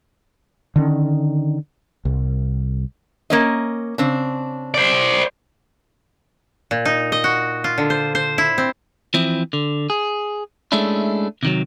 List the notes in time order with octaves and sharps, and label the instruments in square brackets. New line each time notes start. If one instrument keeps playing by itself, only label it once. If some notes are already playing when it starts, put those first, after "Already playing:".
[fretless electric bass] D3 D#3 C#4
C2
[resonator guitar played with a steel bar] A#3 C#4 D#5
C#3 C4 D4
[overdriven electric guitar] C5 D5
[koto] A#2
D#4
D#5
F#4
F4
D3
C5
C5
E4
C4
[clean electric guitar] E3 F3 C4 E4
D3
G#4
G#3 A3 C#4 D4 E4
C3 D#3 F#3